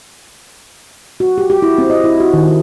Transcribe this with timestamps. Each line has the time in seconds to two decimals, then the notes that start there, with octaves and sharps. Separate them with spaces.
1.20 F#4
1.38 G4
1.50 G4
1.62 E4
1.78 C4
1.90 D#5
2.04 E4
2.20 F#4
2.33 D#3
2.48 D#4